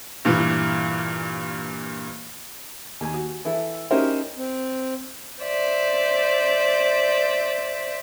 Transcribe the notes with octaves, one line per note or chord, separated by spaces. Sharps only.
G2 A#2 E3
D#2 G#5
F#4
E3 E4 A4
C#4 D#4 E4 G4 A#4 C5
C4
C5 D5 E5